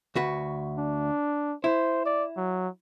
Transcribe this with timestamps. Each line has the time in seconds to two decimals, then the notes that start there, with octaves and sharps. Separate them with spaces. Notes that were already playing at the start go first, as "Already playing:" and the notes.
0.15 D2 F#4 B4
0.78 D4
1.64 E4 C5
2.05 D5
2.37 F#3